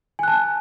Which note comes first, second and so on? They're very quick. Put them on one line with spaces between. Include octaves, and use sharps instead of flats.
G#5 F#6 A5